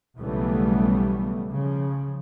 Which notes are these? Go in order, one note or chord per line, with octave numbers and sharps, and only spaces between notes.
B1 C#3 E3 G3 A3 B3
C#3 F3